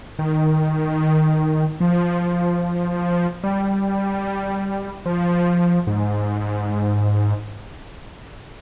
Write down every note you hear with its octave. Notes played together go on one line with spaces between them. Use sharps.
D#3
F3
G3
F3
G#2